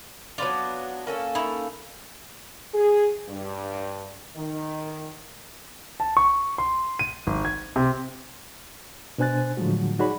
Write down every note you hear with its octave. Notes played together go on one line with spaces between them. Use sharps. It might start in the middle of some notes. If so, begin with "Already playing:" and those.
F#3 B3 D4 F4 D5
A#3 C#4 A4
D#4 E4
G#4
G2
D#3
A5
C#6
C6
D#7
G#1
G#6
C3
B2 D4 C5 G#5 F#6 A6
A2 D3 F3 F#3 G#3 F#4
D#4 F#4 G#4 C#5 D5 B5